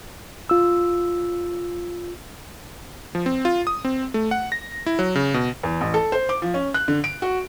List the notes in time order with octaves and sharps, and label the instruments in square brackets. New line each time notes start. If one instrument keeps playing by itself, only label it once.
[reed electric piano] F4 E6
[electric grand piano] F3
C4
F4
D#6
C4
A3
F#5
A#6
E4
F#3
C#3
B2
[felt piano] E2
A1
A4
C5
D6
F3
C#4
F#6
D3
D7
F#4